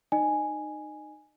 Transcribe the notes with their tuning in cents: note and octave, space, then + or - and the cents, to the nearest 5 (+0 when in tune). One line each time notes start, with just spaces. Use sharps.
D#4 -25 D#5 -30 G#5 +0